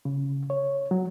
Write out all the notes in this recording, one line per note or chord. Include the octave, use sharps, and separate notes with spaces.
C#3
C#5
F#3